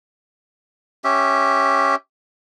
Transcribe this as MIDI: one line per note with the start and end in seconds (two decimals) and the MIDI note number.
1.04 1.95 61
1.04 1.95 67
1.04 1.95 76